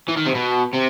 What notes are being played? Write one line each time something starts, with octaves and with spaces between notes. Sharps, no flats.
E3
D#3
C3
B2
C3